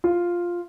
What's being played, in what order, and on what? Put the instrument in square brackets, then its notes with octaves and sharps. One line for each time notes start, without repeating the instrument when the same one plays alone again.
[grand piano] F4